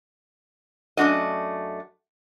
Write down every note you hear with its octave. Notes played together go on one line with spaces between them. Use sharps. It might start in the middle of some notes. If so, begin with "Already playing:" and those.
F#2 A3 D4 F#4 D#5